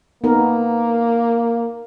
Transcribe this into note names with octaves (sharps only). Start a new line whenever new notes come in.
A#3 B3 D#4 A#4